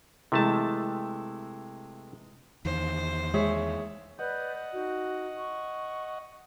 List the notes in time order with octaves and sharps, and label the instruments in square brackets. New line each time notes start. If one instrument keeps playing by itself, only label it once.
[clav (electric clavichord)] C3 A3 A5 [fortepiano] E3 G#3
[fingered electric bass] E2 D#3 [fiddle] C5
[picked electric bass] G#3 [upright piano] G#4 C#5 E5
[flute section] B4 D5 G6 [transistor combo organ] D#5 F#5
[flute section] D#4 F#4
C#6